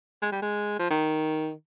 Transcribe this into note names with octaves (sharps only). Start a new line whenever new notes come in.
G#3
G3
G#3
F3
D#3